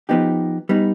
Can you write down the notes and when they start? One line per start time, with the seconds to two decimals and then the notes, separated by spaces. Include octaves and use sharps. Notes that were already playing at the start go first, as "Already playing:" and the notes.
0.09 F3 B3 D#4 G4
0.69 G3 B3 D#4